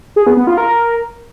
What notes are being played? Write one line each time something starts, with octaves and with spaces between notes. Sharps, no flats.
G#4
B3
B3
F4
A#4